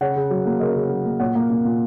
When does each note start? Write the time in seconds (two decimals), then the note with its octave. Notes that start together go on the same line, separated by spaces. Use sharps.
0.01 C#3 C#5 F#5
0.16 C#3
0.31 F#3
0.46 A#3
0.60 C#3 A#4 D#5
0.76 C#3
0.90 F#3
1.05 A#3
1.20 A#2 C#5 F#5
1.35 A#3
1.50 A#3
1.65 A#2